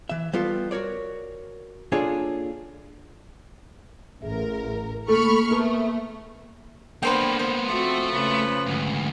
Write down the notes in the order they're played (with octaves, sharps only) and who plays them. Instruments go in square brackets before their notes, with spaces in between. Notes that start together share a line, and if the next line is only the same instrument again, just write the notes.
[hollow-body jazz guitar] E3 E5
G3 B3 F4 A4
F#4 A#4 C#5 D5
A#3 D4 F4 G#4 A4 C#5
[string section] A1 A#4 [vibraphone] G#4 E5
[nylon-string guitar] D2 A3 A4 [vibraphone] A#3 [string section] B5 C#6 F6
[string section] A3 [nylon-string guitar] B3 G#4 A#4
[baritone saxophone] D3 [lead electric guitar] A#3 B3 [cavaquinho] B4 C5 G5
[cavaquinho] C5
[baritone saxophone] F3 [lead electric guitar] A3 [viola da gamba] C4 F#4
[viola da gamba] C#3 B4
[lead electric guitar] D2 G#2